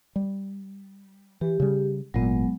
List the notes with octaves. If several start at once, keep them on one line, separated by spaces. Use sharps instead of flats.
G3
E3 G4
C#3 G3
G#1 A#2 F#3 G#3 B3